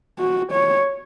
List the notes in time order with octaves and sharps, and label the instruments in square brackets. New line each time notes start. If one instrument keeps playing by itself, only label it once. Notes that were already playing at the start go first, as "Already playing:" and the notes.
[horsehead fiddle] F#4
C#5